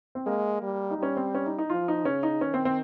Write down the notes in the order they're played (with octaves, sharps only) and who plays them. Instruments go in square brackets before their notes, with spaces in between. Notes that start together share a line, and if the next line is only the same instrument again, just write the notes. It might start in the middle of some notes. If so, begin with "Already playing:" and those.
[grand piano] C4
[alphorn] G#3 [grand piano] A#3
[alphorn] G3
[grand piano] D#4
[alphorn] G3 [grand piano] C#4
[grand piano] C4
C#4
D#4
D#4
[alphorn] F3 [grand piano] F4
[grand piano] D#4
[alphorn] C#3 [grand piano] C#4
[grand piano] D#4
[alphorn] D#3 [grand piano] C#4
[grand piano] C4
C4